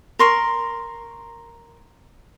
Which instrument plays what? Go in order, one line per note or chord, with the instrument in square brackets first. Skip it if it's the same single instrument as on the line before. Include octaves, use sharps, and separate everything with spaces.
[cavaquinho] A#4 C6 C#6